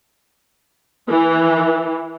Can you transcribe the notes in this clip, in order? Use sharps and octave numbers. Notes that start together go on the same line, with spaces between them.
E3